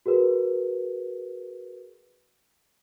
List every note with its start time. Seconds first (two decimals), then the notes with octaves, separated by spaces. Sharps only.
0.06 F#4 G#4 A#4 B4